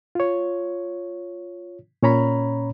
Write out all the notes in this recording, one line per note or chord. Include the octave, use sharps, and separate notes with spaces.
F4 C#5
A#2 C#4 C#5 A#5 B5